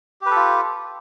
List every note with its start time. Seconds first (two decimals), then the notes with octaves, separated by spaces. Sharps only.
0.21 G4
0.26 B4
0.31 A4
0.36 F4